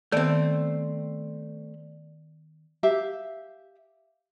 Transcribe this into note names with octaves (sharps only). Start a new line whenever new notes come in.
D#3 A3 B3 C4 D5
G4 E5 F5